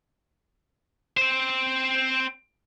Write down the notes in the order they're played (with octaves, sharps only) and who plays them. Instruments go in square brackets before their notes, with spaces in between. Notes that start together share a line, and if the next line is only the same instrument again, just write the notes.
[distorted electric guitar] C4 C5